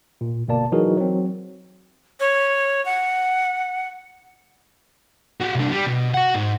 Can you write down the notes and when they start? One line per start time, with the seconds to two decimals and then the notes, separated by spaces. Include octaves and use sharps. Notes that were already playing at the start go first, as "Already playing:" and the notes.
0.21 A#2
0.48 G1 B2 A#3 D5 A5
0.72 E3 F#3 D#4 F#4 G#4 A#4
0.97 F#3 C4
2.20 C#5
2.85 F#5
5.41 F#4 G4
5.56 C2 D4
5.72 G3
5.87 B2
6.14 F#4 F#5
6.34 G#2